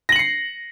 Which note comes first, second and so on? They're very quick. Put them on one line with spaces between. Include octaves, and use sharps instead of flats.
A#6 F#7 C#7 C7